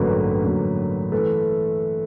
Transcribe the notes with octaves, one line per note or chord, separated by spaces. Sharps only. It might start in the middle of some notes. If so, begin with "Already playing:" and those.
Already playing: A1 G2 D3 F#3 A#3 A4 B4
A1 G2 D3 F#3 A#3
E3 A3 A4 B4